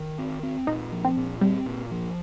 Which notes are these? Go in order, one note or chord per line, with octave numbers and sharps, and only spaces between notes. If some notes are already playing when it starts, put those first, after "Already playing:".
Already playing: D#3
C4
C4
A#2 D#4
F3
C4
A#2
G3 C4
A#2
F3